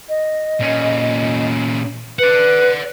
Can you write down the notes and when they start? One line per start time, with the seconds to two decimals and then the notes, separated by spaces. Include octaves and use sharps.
0.09 D#5
0.60 A#2 C#4
2.19 B4 D5 F#5